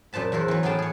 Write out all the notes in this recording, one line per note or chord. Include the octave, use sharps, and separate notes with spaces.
F#2 A#2 C5 A5 B5
E2 E4 A#4 C5 F#5
E3 F#3
A2 B3 C#4 G#4 G5 A5
G#4 C#5